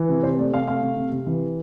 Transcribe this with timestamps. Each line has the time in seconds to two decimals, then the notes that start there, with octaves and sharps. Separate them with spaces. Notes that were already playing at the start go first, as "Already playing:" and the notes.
Already playing: E3
0.09 C3
0.23 C3 C5
0.38 A3 D5
0.53 C3 F5
0.68 A3 F5
0.82 C3
0.96 C3
1.12 C3
1.26 E3